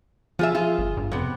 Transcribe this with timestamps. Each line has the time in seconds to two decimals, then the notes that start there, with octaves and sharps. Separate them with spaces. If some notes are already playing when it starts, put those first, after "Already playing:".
0.39 F3 F4 G#4 E5
0.55 F4 G#4
0.78 G1
0.97 G2
1.12 F2 C3 B3